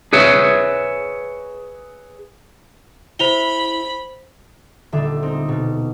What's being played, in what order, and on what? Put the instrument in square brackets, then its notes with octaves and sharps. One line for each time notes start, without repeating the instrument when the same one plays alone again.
[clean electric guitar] G#4 B4 C#5 E5
[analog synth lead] E4 [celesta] C5 F7 G7 [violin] B5
[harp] D#1 D3 A4 E5
C4 D#4
B2